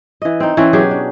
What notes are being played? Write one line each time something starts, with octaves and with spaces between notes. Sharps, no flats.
E3 D#5
C4 D#4
E3 C4 C#4
B2 F#3 G4 G#4
D4